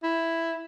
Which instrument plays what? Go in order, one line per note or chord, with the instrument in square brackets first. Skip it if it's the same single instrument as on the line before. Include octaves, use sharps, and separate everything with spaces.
[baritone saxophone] E4